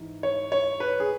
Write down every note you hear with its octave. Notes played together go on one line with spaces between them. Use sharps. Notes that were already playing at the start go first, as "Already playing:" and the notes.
Already playing: G#2 E3
C#5
C#5
B4
G#4